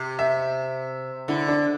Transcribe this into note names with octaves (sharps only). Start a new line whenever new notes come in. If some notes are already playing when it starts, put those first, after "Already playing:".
Already playing: C3
E5
D3 E4
D4